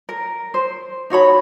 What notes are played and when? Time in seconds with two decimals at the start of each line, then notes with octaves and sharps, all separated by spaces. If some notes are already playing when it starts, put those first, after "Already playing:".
0.09 A#4
0.54 C5
1.10 D#4 F#4 C#5 B5